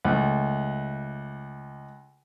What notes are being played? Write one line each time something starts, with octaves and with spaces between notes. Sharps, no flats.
C#2 A3